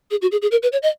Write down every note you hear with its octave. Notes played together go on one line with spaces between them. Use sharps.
G#4
F#4
G#4
G#4
A#4
B4
C#5
D#5